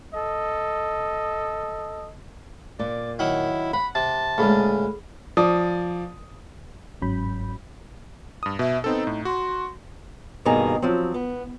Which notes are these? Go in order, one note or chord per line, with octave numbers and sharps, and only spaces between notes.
A4 D#5
A#2 D5
D#3 F#3 E4 F#5
F#5 B5
C3 A5
D2 A#2 C#3 G#3 G#4 A4 B5
F3 D5 D#6
G1 G#2 F#3 C#4 B5 G6
G2 D#6
B2 E5
B3 C4 D#4 A4
A2
F#4 C6
G2 B2 D#3 A#3 G#4 A#5
F3 F#3 C4
B3